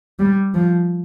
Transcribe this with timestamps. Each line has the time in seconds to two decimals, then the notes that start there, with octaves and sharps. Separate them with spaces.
0.19 G3
0.54 F3